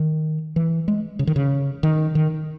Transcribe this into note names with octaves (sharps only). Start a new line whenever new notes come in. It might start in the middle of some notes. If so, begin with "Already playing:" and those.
Already playing: D#3
E3
G#3
C#3
D#3
C#3
D#3
D#3